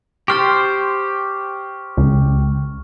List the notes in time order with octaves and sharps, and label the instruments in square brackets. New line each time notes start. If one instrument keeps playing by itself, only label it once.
[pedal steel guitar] G4 C5 [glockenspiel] C#6 F6 A6
[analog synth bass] C#2